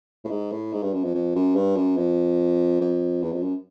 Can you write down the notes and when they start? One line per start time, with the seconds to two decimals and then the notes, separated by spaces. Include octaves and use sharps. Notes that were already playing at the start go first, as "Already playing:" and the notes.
0.25 A2
0.31 G#2
0.52 A2
0.73 G#2
0.83 G2
0.94 F#2
1.04 F2
1.15 F2
1.35 F#2
1.55 G2
1.76 F#2
1.97 F2
2.81 F2
3.23 E2
3.32 F2
3.43 F#2